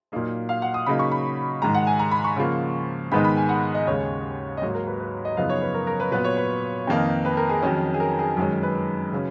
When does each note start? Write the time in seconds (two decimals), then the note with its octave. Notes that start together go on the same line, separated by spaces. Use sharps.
0.12 A#2 F#3 A#3 D#4
0.49 F5
0.62 F#5
0.74 D#6
0.86 C#3 F#3 A#3 D#4 B5
0.99 C#6
1.12 B5
1.62 G#2 D#3 G#3 A#5
1.74 F#5
1.87 G#5
1.99 A#5
2.12 B5
2.24 C#6
2.36 C#3 F3 A#3
3.12 G#2 D#3 G#3 B3 D#4 B5
3.25 B5
3.37 G#5
3.49 F#5
3.74 D#5
3.87 D#2 C#3 G#3 C#5
4.57 D#5
4.62 G#2 F#3 A#3 D#4 C#5
4.74 A#4
4.87 B4
4.99 B4
5.25 D#5
5.37 F#2 C#3 F3 B3 D#4 F5
5.49 C#5
5.62 B4
5.74 A#4
5.87 A#4
6.00 B4
6.11 A#2 F#3 B3 B4
6.24 C#5
6.37 B4
6.87 F2 D#3 A#3 D#4
7.25 B4
7.37 A#4
7.49 G#4
7.62 F2 D#3 F#3 C#4
7.94 G#4
8.00 A#4
8.19 G#4
8.37 F#2 D#3 G#3 C#4
8.62 B4
9.12 C#3 F#3 C#4